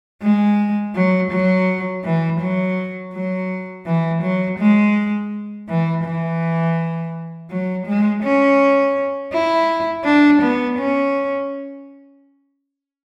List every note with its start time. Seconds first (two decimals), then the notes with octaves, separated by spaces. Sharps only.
0.22 G#3
0.95 F#3
1.31 F#3
2.04 E3
2.41 F#3
3.14 F#3
3.86 E3
4.22 F#3
4.59 G#3
5.68 E3
6.04 E3
7.50 F#3
7.86 G#3
8.23 C#4
9.33 E4
10.04 D4
10.42 B3
10.78 C#4